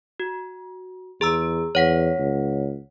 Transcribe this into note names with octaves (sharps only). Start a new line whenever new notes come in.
F#4
E2 G#4 A#5 E6
E2 C#5 F#5 B6
C#2